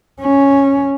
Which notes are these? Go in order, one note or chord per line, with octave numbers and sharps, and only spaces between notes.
C#4